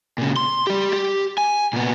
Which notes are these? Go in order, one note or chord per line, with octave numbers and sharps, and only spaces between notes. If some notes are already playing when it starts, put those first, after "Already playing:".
A#2 C#3
C6
G3 G4
G4
G#5
A#2 B3